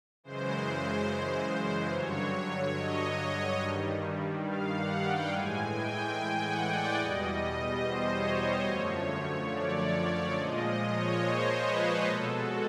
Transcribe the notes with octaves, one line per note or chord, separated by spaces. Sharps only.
F#2 C#3 E3 G#3 C5
G2 D3 F#3 C#5
D#5
G2 D#3 G3
F5
F#5
G5
A2 E3 G#3 G#5
G5
G5
F#5
D5
E2 B2 G3 D#5
D#5
C5
C#5
C#5
F#2 D3 F3 A3
D5
A#2 F3 G#3 D#5
D#5
C#5
C5
B4
B2 G#3 A4
F#4